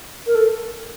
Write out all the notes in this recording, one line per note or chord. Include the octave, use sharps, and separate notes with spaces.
A#4
A4